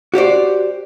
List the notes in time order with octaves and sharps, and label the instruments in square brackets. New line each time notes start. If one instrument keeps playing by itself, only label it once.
[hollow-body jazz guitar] F#4 G4 C5 D5